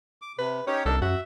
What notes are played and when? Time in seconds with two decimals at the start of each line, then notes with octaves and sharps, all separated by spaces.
0.22 D6
0.39 C3 B4
0.67 C#4 D#4 G4 C#5
0.86 C2 D4 D#4 A4 A#4
1.02 F#2 F#4 E5